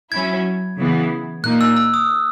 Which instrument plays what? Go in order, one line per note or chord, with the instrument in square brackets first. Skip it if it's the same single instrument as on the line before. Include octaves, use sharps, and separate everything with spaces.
[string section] F#3 C#4 E4 [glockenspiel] G#6
[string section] C#3 E3 B3
[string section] A#2 A#3 D#4 [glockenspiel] F#6
[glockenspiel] E6
E6
D#6